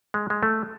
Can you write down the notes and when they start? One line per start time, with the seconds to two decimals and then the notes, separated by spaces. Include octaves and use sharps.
0.14 G#3
0.30 G#3
0.43 A3